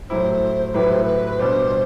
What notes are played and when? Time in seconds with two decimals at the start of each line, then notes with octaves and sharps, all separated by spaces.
0.09 A2 F#3 A3 E4 G4 C5
0.74 A2 F#3 A3 E4 G4 B4
0.88 C5
1.02 B4
1.38 B2 G3 D4 C5